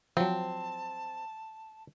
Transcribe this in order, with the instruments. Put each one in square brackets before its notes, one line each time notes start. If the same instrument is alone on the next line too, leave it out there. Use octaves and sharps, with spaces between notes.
[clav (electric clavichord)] F3 F#3 [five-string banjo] C4 [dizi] A5